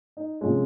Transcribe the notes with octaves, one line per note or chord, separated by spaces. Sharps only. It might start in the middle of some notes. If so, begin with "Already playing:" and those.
D#4
C3 F3 G#3 C#4 F4